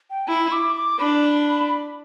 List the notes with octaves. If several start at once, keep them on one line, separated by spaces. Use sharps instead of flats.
G5
E4 B5
D6
D6
D4 B5